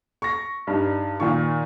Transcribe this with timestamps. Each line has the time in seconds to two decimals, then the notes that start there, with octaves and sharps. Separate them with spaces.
0.22 C#6 A#6
0.67 G2 D#4
1.20 A#2 D#3 F4 C#6